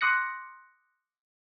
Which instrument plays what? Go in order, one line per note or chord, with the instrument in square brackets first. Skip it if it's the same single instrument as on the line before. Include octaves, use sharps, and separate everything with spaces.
[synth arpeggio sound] C6 D6 D#6 F#6 A#6 C#7